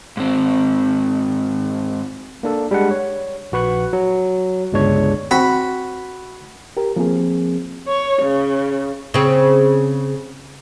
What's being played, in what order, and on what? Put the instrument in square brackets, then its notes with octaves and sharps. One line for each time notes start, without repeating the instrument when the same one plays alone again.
[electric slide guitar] G#2 C4
[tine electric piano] A#3 D4 A4
G3 G#3 D4 F#5
C#5
A#1 F#4 B4 C#6 F#6
F#3
G1 C#2 G#3 D4 C#5
[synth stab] C4 [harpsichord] F#4 [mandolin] B5
[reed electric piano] G4 A#4
F3 A#3 C4 G#4
[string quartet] C#5
C#3
[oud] C#3 C4